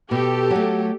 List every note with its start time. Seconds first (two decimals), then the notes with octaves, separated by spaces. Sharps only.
0.11 B2 G4 A4
0.51 F#3 A3